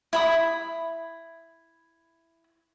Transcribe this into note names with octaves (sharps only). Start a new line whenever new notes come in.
E4 B5 D#6